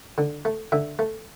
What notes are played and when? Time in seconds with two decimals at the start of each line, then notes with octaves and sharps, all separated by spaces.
0.18 D3
0.45 A3
0.72 D3 E5
0.99 A3